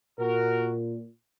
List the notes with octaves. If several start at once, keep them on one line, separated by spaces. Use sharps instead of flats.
A#2 F#4 A#4